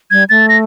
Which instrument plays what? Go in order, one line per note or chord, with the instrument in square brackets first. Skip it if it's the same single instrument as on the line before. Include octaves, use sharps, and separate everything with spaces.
[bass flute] G3 [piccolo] G#6
[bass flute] A3 [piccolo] A6
[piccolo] A#6